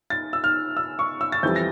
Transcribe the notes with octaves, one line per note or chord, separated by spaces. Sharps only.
A6
E6
F6
E6
C#6
E6
A6
F2 E3 G3 G6
A#6